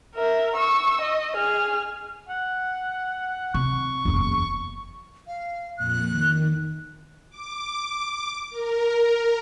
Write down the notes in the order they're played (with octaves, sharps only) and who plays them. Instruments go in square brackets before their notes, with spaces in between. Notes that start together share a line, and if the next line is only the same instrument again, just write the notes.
[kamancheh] A#4 E5
C#6 E6
D#5
G#4 F6
[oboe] F#5
[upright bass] C3 [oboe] C#6
[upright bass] F#1 E2
[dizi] F5
[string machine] F2 A#2 [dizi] F#6
[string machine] D#3
D6
A#4